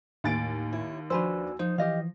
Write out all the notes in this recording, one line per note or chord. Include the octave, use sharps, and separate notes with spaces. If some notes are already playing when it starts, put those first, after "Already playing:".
D#2 A2 G#5 A6 D7
E4 C#5
F3 D4 F#4 B4 C5 G#5 E6
F3 D#4 C5
E3 G4 D#5 F5